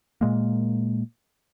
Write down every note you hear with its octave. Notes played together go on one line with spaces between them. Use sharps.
A#2 G#3 A#3